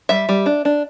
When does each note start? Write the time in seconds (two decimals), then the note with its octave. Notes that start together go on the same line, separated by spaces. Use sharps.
0.09 G3 E5
0.29 G3
0.46 D4
0.65 D4